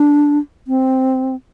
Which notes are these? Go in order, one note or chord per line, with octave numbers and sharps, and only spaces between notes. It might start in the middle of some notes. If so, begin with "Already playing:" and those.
Already playing: D4
C4